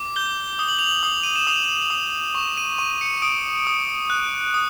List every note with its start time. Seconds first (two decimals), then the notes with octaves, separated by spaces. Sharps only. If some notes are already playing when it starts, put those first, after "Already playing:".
Already playing: D6
0.16 G6 G7
0.59 D#6 G7
0.68 F#7
0.79 F7
0.87 F#7
1.03 D#6
1.23 D#7
1.36 E7
1.47 D#6 F7
1.90 D#6
2.35 C#6 E7
2.57 D#7
2.78 C#6 D#7
3.01 C#7
3.22 D#6 D7
3.67 D#6
4.10 F#6
4.54 D#6